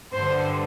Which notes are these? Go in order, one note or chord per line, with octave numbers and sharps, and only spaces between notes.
G2 D3 C5